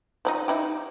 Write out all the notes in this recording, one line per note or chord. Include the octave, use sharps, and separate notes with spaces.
F3 D4 D#4
D#4 E4 G4